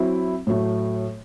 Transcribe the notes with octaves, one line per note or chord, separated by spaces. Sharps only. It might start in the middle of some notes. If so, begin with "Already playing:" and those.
Already playing: F#3 C4 E4
A2 F#3 A3